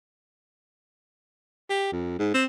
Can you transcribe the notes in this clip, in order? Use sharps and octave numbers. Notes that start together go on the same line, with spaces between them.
G4
F2
G#2
C4